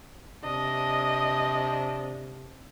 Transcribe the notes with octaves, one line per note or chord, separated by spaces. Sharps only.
C3 D4 D#5